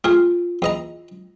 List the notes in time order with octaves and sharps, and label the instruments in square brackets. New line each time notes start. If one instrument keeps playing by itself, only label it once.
[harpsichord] A3 G#4 [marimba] F4
[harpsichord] E2 D#5 A#5